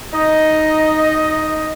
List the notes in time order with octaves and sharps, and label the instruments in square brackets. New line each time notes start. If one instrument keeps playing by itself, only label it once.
[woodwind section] D#4 D#5